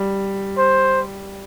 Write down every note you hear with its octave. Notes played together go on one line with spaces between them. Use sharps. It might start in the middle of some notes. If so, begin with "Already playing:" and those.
Already playing: G3
C5